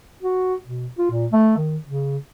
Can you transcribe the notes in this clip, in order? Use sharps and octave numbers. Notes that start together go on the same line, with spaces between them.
F#4
B2
F4
A#2
A3
D#3
C#3